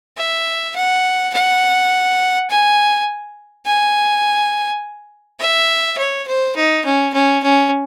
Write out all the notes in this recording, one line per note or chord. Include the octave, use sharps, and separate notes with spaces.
E5
F#5
F#5
G#5
G#5
E5
C#5
C5
D#4
C#4
C#4
C#4